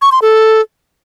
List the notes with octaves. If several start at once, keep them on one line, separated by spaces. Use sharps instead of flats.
C#6
C6
A4